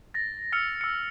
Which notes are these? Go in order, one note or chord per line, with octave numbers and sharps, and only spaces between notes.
A6 A#6
E6 F6 A#6 C#7 F7
E6 C#7